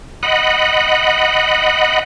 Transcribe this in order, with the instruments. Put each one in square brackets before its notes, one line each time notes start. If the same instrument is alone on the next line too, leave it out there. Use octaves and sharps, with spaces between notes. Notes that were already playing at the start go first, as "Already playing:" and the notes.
[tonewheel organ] D#5 F#5 B5